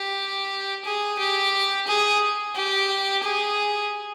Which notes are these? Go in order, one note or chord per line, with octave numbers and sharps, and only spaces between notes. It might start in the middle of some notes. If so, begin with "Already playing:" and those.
Already playing: G4
G#4
G4
G#4
G4
G#4